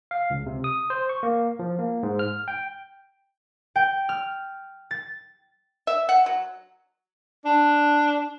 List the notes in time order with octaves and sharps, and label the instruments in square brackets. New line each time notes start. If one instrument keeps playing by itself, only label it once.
[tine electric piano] F5
C#2
C3
D#6
C5
C#6
A#3
F3
A#3
G#2
F6
G5
[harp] G5
F6
A6
[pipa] E5
F#5
F#3
[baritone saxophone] D4